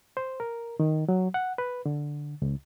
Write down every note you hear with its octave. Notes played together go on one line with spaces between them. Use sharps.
C5
A#4
D#3
F#3
F#5
B4
D3
C#2